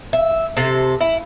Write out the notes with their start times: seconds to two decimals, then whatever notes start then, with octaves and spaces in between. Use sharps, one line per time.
0.13 E5
0.57 C3 A4
1.01 E4